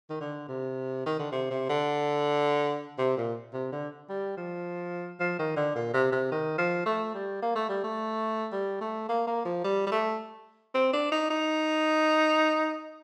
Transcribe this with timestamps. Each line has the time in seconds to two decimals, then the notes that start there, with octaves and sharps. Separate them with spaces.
0.10 D#3
0.21 D3
0.48 C3
1.06 D#3
1.19 D3
1.32 C3
1.50 C3
1.69 D3
2.98 C3
3.17 A#2
3.53 C3
3.72 D3
4.09 G3
4.37 F3
5.20 F3
5.39 D#3
5.57 D3
5.76 A#2
5.93 C3
6.12 C3
6.32 D#3
6.58 F3
6.86 A3
7.14 G3
7.42 A#3
7.55 A3
7.69 G3
7.84 A3
8.52 G3
8.81 A3
9.09 A#3
9.27 A#3
9.45 F3
9.64 G3
9.87 G3
9.92 A3
10.74 C4
10.93 D4
11.12 D#4
11.30 D#4